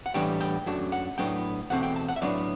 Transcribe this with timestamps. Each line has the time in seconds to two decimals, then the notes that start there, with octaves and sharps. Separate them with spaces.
0.06 F#5
0.14 A2 E3 G3 B3 D4 G5
0.41 G5
0.66 F#2 F#3 A3 D4
0.92 F#5
1.18 A2 F#3 B3 D4 G5
1.70 E2 B2 A3 C4 F#5
1.83 G5
1.96 A5
2.08 F#5
2.16 E5
2.21 A2 F#3 B3 D4 D5